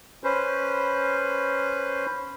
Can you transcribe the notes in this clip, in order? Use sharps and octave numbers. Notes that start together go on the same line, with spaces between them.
C#4 B4 C5